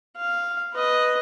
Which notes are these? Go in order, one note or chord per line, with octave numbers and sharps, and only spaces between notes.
F5
B4 D#5